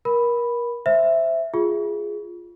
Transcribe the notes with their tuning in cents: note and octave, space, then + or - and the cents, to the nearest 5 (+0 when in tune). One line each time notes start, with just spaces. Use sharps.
A#4 +30 B5 +0
C5 +0 E5 +0
F4 +0 G#4 +0